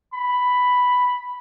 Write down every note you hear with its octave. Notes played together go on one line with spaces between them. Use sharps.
B5